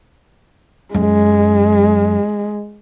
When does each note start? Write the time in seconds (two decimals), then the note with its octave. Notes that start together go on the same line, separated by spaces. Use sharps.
0.94 F#2 G#3